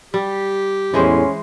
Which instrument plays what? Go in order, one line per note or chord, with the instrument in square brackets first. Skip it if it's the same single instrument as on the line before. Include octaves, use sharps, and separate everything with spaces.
[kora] G3 [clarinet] G4
[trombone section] E2 A2 [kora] E3 G#3 C5 [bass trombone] C#4